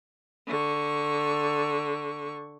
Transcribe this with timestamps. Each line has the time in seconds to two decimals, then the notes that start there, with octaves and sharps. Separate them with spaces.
0.47 D3 C#6